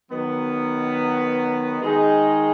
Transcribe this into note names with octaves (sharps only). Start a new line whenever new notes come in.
D#3 F#3 B3
D#3 G#3 D#4 G#4